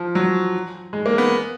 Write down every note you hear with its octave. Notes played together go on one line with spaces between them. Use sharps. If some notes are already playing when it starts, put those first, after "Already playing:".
Already playing: F3
F#3
G#3
A#3
B3